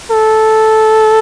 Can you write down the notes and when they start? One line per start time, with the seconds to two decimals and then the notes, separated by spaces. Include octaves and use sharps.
0.11 A4